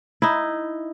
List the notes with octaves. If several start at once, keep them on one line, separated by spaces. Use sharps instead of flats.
D#4 E4